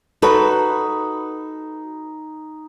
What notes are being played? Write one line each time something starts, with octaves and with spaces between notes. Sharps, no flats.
D#4 F#4 A4 B4